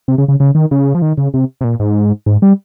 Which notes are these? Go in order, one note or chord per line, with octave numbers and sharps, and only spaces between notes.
C3
C#3
C#3
C#3
D#3
C#3
F3
D#3
C#3
C3
C3
A#2
G#2
G#2
G3